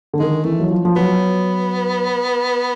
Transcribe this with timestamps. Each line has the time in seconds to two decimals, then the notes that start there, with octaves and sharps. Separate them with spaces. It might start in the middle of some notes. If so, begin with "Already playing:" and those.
0.13 D3
0.20 D#3 G#3
0.44 E3 A3
0.60 F#3
0.71 F3
0.85 F3
0.96 F#3 B3